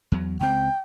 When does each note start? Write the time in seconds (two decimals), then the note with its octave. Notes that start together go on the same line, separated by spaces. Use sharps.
0.12 E2 F#3
0.41 C#2 C4 G5